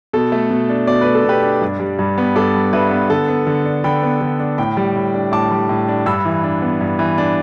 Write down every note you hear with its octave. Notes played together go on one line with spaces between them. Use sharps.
B2 A4
A3
B2
D4
B2 D5
A3 B4
A4
B2 G4 B4
D4
G2
G3
G2
B3
G2 A4 D5
G3
G2 B4 E5
B3
D3 A4
B3
D3
D4
D3 G5 B5
B3
D3
D4
A2 G5 B5
G3
A2
D4
A2 A5 D6
G3
A2
D4
G2 B5 E6
E3
D4
B3
G2
E3
D4